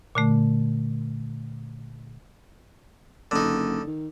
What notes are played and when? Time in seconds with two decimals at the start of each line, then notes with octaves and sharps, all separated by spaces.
0.15 A#2 D3 A3
3.31 F#1 D3 D#4
3.87 D#3